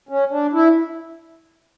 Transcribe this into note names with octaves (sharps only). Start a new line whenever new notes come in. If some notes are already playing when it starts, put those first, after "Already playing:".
C#4
D4
E4